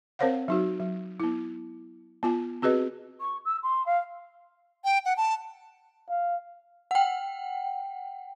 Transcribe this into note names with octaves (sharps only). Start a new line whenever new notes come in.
C4 A#4 C5 C#5 F5 F#5
F#3 D#4 F#4
F#3
B3 E4
B3 F4 G#5
C4 F#4 G#4 B4 D#5
C#6
E6
C6
F5
G5
F#5
A5
F5
F#5 G5